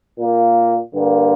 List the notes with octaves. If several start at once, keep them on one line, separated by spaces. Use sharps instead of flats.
A#2 A#3
G2 D3 A#3